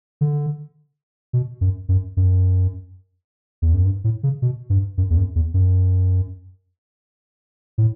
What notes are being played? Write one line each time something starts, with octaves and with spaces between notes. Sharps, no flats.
D3
B2
F#2
F#2
F#2
E2
F#2
G2
A2
C#3
B2
G2
F#2
E2
F#2
E2
F#2
A2